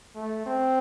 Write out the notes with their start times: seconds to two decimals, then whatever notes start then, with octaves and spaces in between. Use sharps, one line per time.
0.16 A3
0.46 C4